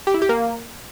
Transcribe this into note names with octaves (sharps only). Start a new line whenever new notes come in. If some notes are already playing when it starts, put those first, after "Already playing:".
G4
E4
G4
A#3